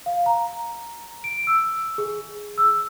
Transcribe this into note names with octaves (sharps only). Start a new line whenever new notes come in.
F5
A#5
D7
E6
G#4
E6